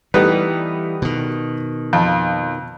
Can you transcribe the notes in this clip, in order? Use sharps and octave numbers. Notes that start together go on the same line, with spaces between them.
E3 G3 A3 B3 D#4 B4
B2 D#3
F2 F5 A5